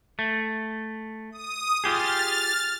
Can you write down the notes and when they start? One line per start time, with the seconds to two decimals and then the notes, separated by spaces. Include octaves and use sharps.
0.19 A3
1.32 D#6
1.84 F4 G4 G#4 F6 A6